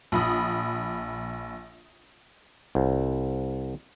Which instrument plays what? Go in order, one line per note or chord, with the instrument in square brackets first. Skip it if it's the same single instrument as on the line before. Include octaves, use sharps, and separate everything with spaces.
[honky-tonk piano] A#1 B5 D#6
[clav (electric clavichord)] C2